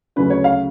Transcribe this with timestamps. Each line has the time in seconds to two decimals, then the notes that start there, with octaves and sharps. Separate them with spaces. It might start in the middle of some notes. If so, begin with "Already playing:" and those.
0.16 D2 C#3 F#3 C#4 B4
0.30 C#5
0.44 F5